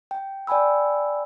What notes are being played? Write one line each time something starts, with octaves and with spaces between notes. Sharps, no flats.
G5
D5 G5 G#5 B5 E6